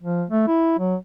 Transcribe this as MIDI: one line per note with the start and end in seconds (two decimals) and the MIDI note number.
0.03 0.25 53
0.30 0.45 57
0.47 0.75 64
0.79 0.95 54